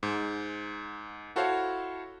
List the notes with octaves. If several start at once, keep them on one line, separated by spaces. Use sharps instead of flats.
G#2
E4 F#4 A4 C5 C#5 F5